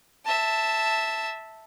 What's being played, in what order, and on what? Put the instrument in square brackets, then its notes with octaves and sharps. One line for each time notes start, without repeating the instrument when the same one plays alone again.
[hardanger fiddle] E5 A5